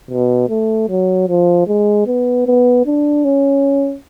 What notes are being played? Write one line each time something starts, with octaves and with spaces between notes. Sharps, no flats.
B2
A3
F#3
F3
G#3
B3
B3
D4
C#4